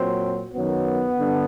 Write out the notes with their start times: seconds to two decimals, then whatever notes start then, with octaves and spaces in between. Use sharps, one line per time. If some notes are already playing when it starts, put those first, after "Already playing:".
Already playing: A#2 F#3 C4
0.54 F#2 D#3 F#3 B3
1.17 G2 D3